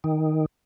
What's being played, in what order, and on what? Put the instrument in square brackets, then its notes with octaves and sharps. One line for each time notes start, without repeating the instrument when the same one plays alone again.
[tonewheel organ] D#3